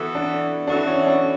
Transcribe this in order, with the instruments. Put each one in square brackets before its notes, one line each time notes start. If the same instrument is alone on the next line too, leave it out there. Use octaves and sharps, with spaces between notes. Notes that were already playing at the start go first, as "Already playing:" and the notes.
Already playing: [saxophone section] E3 B3 F#4 A4 [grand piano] E4
[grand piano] D4
[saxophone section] E3 B3 F#4 A4 [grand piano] D4
[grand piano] C#4
D4